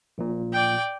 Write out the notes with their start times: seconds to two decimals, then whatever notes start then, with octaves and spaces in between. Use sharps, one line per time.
0.18 A#1 A#2
0.53 D5 G5